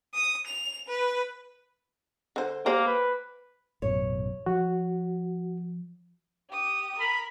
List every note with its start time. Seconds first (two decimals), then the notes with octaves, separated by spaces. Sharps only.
0.14 D#6
0.47 F7
0.88 B4
2.36 D3 C5
2.66 A#3 G4 C5 D5
2.87 B4
3.82 A1 F#2 B2 C#5
4.46 F3 F#4
6.50 G4 D#6
6.99 A#4 B5